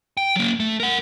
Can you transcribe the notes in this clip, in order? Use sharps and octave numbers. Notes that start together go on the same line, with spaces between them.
G5
F#3 A#3
A3
A#4 F#5